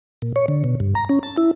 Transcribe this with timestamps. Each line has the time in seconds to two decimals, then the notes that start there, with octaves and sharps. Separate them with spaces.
0.22 A#2
0.36 C#5
0.48 D3
0.64 B2
0.80 G2
0.95 A#5
1.09 C#4
1.23 A5
1.37 E4